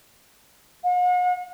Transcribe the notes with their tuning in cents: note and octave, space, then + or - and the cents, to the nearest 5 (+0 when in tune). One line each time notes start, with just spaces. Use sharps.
F#5 -45